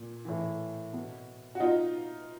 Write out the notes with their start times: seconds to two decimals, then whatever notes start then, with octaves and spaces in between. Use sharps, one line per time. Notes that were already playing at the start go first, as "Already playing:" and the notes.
Already playing: A#2
0.25 A2 E3
0.93 B2
1.55 F#4
1.60 B2 D#4 F4